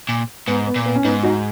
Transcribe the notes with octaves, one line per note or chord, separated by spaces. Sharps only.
A#2
G#2 B3
B3
A#2
B3
C#4
G#2 B3 D#4
D#4 F#4